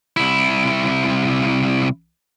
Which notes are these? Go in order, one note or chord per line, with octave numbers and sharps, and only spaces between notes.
C2 E4